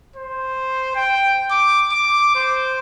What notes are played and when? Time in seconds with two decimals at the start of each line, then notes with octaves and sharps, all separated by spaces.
0.16 C5
0.96 G5
1.51 D6
1.92 D6
2.35 C5